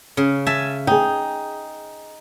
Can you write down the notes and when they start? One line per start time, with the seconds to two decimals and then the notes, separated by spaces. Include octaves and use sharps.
0.17 C#3
0.46 E5 G#5 A5
0.87 D#4 G#4 G5